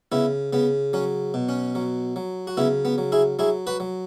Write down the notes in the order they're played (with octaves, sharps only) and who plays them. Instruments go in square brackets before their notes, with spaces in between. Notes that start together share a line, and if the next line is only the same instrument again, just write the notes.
[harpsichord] C#3 B3 E4
C#3 B3
F#3 C#4
B2
C#4
F#3
F#3
F#4
C#3 B3 E4
B3
F#3
E4 G#4
F#3 E4 G#4
F#4 B4
F#3